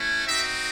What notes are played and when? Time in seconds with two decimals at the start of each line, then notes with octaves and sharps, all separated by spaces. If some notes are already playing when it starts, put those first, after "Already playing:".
Already playing: A3 C#4 E4
0.26 C4 D#4 F#4 E5